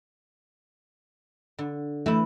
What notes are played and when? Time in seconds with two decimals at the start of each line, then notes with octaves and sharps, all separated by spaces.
1.59 D3
2.06 E3 A3 E4